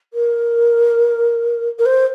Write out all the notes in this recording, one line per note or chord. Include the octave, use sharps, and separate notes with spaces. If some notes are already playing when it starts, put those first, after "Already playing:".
A#4
A#4
C5